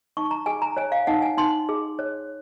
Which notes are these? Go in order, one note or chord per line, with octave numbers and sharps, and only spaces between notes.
D#4 C#6
A#5
G#4 G#5
A#5
C#5 G#5
F5
D#4 F#5
G#5
D#4 C6
G#4
C#5